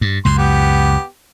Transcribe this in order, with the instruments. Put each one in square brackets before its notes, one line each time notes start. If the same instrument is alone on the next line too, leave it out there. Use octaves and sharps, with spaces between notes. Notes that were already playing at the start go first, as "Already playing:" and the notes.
[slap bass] G2
[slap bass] C#2 F#2 [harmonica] C6
[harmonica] B3 G4